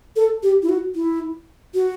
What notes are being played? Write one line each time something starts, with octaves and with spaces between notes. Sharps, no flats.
A4
G4
E4
F#4
E4
F#4